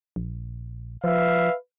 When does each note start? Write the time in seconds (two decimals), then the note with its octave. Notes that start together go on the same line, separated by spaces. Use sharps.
0.16 A#1
1.04 F3 B4 E5 F5